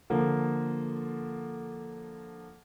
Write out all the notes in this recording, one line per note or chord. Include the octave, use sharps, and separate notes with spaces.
D3 F3 A#3